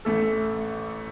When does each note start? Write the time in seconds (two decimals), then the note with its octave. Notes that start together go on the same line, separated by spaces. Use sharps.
0.05 A1 A3 A4